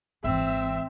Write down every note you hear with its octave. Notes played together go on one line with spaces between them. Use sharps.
G#1 E3 C4 E5